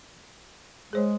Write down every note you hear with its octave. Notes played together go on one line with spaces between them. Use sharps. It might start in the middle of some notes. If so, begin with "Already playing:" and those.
G#3 G#4 C5 C#5